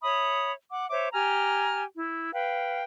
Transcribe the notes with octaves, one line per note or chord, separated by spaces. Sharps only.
C#5 E5 B5 D#6
F#5 D6
C5 C#5 E5 D6
G4 G#5 A#5 F6
E4
B4 F5 G5